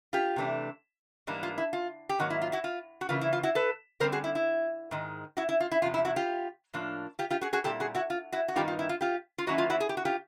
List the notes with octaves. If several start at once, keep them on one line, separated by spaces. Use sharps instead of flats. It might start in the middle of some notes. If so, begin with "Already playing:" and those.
F4 G4
C3 E3 A3 D4
G#2 E3 G3 A#3 D4
F4
E4
F4
G4
G#2 D#3 F#3 A#3 F#4
E4
F4
E4 F#4
F4
F#4
C#3 E3 G3 A#3 F4
E4
F4
E4 F#4
A4 B4
D3 G3 C4 A#4 C5
F#4 G#4
E4
E4
G#2 D#3 G#3
E4 F#4
E4
F4
E4
E2 C3 F3 F4
E4
E4 F#4
F4 G4
A2 F3 A#3 D4
F4 G4
F4 G4
F#4 G#4
F#4 G#4
A#2 G3 C4 E4 G4 A4
F#4 G#4
E4 F#4
F4
E4 F#4
F#4
G2 D#3 G3 B3 D#4 F4 G4
F4
E4
F4
F4 G4
F4
D#3 F#3 A#3 C#4 E4 F#4
F4
E4 F#4
G#4
G4
F#4
F4 G4